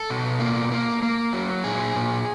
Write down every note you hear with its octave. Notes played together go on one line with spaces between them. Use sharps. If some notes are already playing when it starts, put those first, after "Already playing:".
Already playing: A4
B2
A#3
A#3
A#3
F#3
A#2 G#4
A#2